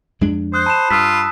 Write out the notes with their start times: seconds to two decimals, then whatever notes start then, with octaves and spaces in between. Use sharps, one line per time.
0.21 F2 G#3 D4
0.54 C5 D#6 F#6
0.66 A5 B5 F#6 E7
0.90 G2 F4 D#6 E6 B6